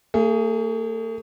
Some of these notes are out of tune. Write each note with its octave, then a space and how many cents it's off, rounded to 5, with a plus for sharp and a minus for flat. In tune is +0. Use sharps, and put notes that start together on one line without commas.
A3 +45 G#4 +0